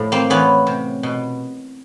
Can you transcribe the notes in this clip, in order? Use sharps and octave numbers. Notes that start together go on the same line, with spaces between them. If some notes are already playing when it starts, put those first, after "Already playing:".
Already playing: A2 F3
A#3 C4
E3 B3 C#4
C3
B2